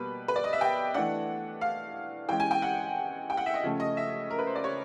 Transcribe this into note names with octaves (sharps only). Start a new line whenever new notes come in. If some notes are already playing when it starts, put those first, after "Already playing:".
Already playing: B2 G3 A#3 B4
B4
D5
D#5
E5
G5
E3 A3 D4 F#5
F5
E3 G#3 C#4 G5
G#5
G5
F#5
G5
F#5
E5
D#5
C#3 F3 A3 C#4
D#5
E5
A#4
B4
C5
D5
C#5